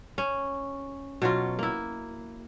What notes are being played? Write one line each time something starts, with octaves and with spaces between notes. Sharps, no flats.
C#4
B2 F#3 F4
A#3 E4